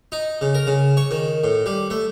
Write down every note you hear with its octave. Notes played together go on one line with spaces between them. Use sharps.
D#4
C#3
A#4
C#3
C#5
D#3
A2
G3
A3